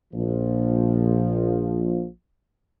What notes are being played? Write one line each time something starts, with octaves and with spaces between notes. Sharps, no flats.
A#1 F3